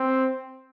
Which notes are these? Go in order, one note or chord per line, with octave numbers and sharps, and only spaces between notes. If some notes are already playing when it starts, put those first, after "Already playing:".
Already playing: C4